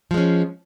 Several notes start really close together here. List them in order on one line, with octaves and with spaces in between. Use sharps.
F3 G#3 C#4